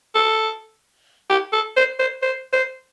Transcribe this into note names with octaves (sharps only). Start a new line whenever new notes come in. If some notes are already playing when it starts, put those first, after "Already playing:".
A4
G4
A4
C5
C5
C5
C5